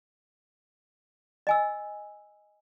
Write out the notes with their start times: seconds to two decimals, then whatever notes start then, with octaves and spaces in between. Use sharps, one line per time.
1.47 D#5 G#5 E6